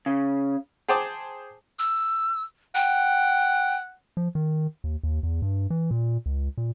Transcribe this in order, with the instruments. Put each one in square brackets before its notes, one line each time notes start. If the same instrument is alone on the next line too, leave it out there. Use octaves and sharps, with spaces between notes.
[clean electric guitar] C#3
[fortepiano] G#4 C5 G5 A5 D6 D#6
[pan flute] E6
[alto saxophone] F#5 [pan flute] G5
[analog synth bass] F3
D#3
D#2
D#2
E2
G2
E3
A#2
C#2
A#2